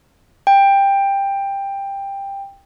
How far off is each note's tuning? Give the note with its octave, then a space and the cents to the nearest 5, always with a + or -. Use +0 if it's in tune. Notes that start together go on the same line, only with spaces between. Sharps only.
G5 +15